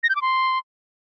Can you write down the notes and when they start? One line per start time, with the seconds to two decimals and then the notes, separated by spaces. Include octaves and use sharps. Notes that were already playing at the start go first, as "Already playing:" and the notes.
0.03 A#6
0.09 G6
0.16 D6
0.22 C6